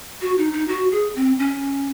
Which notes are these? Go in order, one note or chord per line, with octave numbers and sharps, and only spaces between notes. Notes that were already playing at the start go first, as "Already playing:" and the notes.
F#4
D#4
D#4
F#4
G#4
C4
C#4